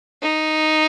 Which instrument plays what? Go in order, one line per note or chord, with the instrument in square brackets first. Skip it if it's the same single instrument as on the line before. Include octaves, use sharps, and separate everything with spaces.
[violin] D#4